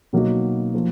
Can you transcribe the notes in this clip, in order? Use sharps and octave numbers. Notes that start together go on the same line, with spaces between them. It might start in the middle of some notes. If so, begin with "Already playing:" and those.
B2 F#3 A#3 D#4 F#4
F3 A#3